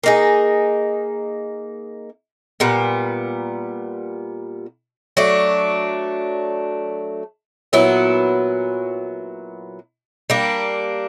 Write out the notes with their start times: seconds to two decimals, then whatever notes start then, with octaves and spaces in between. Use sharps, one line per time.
0.04 A#3 D#4 G#4
2.60 A#2 G3 B3
5.17 F#3 A3 D4
7.73 A#2 F#3 B3 E4
10.30 G3 A#3 D4